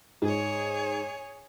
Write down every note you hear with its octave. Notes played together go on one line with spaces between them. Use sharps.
G#2 G#4 C#5